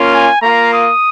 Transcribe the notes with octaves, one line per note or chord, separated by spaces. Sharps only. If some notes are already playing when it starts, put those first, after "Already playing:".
Already playing: A#3 C#4 F4
G#5
A#3 F4 A#5
D#6